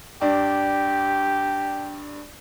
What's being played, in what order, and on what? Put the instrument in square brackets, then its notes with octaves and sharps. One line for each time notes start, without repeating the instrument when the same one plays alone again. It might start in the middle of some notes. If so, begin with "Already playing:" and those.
[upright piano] G2 D4 [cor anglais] G4